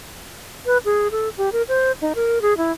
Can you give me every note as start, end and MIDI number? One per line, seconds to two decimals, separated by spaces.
0.66 0.78 71
0.85 1.08 68
1.11 1.29 69
1.38 1.50 67
1.52 1.62 70
1.68 1.92 72
2.02 2.13 63
2.15 2.42 70
2.42 2.57 68
2.58 2.72 64